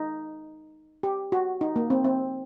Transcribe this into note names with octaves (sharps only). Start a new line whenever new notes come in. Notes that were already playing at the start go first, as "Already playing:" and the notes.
Already playing: D#4
G4
F#4
D#4
A#3
C4
C4